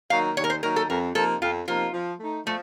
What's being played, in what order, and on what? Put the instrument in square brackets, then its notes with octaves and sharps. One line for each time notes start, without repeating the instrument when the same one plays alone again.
[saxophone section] D#3 F#3 A#3 D#4 [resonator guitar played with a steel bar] F5
[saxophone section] D#2 [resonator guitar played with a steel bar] C#5
[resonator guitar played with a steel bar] A#4
C5
[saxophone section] D#3 F#3 A#3 D#4 [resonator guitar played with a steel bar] A#4
[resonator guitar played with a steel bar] A4
[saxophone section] F2 [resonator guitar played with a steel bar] A#4
[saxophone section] C3 F3 A#3 D#4 [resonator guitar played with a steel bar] A4
[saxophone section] F2 [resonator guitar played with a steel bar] F4
[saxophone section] C3 F3 A#3 D#4 [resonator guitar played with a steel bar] F4
[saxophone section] F3
A3 D#4
[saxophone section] F3 [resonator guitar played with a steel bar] A3